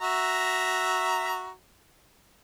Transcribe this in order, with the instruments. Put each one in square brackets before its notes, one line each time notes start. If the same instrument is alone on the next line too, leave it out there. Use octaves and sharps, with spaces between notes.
[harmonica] F#4 E5 A#5